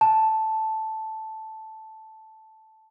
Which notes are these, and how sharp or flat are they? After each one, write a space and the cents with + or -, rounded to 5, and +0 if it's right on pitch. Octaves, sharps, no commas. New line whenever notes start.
A5 -5